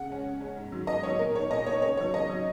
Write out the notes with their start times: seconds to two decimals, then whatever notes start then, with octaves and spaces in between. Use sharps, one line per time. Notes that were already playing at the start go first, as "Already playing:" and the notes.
Already playing: C#3 F#5
0.09 G#3 C#4
0.24 C#3
0.40 G#3 C#4
0.56 G#2
0.72 D#3 F#3
0.87 G#2 D#5
1.03 D#3 F#3 C#5
1.19 A#2 A#4
1.35 A#3 D#4 C#5
1.50 A#2 D#5
1.66 A#3 C#5
1.71 D#4
1.81 C#3 C#5
1.97 F#3 D#4 C#5
2.14 C#3 D#5
2.29 F#3 D#4